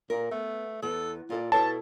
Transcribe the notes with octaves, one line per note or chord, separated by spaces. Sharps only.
A#2 A#4
A3 B3
E2 B3 A4
A#2 F4 A4 D5
B2 E4 A4 C#5 A5